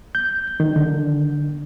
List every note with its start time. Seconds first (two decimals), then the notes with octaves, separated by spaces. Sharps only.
0.15 G6
0.60 D#3
0.76 D3